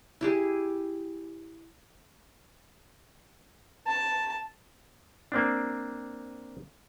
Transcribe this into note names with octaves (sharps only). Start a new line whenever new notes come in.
E4 G4 G#4
A5
A#3 C4 D4